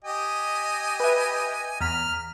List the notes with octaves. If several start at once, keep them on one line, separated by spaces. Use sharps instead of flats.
G4 D#5 G#5
B4 E5
E2 A#5 F6 B6